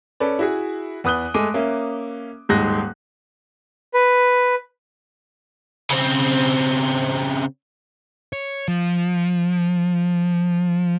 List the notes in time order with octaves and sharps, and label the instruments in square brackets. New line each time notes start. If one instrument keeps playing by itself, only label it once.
[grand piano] C#4 A4 B4 D5
E4 F#4 G#4
E2 B4 D#6 F#6 G7
G#3 A3 G#5 D6 D#7
A#3 C#4 E5
D#1 G#2 G#3 F#6 A#6
[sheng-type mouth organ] B4
[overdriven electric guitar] C#3 C4
[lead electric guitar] C#5
F3